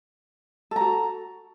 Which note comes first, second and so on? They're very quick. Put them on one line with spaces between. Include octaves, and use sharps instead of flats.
A4 A#5 F#4